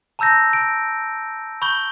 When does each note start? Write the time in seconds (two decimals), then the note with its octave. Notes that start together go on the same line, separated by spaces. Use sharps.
0.19 A5 A#5 E6 G6 A#6
0.53 D7
1.62 B5 C#6 G6 G7